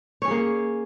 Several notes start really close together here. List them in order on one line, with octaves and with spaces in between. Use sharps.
C#5 C#4 G#4 A#3